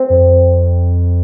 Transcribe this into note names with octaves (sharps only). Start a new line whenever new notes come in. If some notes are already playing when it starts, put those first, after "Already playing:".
Already playing: C4
F2